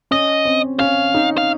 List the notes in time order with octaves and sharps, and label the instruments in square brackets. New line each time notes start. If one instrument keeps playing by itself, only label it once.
[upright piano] C#4 [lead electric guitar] D#5
[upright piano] C4
[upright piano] C#4 [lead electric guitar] F5
[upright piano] D#4
[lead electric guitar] F5